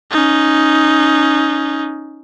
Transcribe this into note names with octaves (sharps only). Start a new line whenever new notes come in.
C#4 D#4